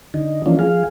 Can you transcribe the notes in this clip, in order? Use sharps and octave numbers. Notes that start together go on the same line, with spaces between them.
D3 D#4
E3 F3 A#3 C#4 D4 F4
F3 G#4 F5